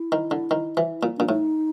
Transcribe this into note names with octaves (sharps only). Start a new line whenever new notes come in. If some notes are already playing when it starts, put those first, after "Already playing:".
Already playing: E4
D#3
D3
D#3
E3
A#2
A#2 D4
A2 D#4